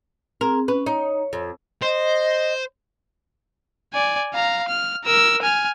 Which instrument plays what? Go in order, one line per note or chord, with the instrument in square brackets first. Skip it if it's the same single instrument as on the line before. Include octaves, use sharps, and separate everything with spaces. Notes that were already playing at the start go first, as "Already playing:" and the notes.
[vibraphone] C4 G#4 [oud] A#4
[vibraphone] C#4 [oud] B4
[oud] D#4 [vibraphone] C#5
[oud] F2
[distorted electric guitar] C5 [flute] D#5
[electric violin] D5 G#5
F5 A#5
F6
A#4 E6
G#5 F6